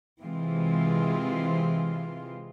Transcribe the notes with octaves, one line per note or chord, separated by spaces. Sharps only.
C3 E3 G#3 C4 F4